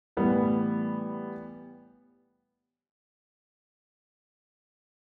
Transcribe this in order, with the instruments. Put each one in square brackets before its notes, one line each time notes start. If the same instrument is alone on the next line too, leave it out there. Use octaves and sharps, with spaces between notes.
[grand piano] A2 E3 G3 B3